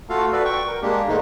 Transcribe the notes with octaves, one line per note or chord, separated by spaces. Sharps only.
A3 F4 F#4 A4 F5
F#4 A4 B4 D5
G5 C#6
A#4
G#3 A#3 D4 G4
G#2 D3 D#3 G#3 A#3 D#4